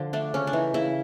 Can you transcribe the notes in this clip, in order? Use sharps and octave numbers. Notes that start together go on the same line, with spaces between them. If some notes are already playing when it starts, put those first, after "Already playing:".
Already playing: D3 F3
A3 D4
C#3 C#4
D4
E3 D#4
C#3 E4